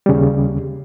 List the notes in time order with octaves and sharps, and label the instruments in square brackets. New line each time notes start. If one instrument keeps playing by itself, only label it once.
[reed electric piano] D#2 C#3 G3